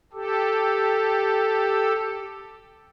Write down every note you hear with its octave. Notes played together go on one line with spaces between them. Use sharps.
G4 A4